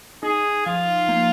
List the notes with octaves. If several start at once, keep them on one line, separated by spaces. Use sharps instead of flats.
D#4 G#4
F3 F4
A#3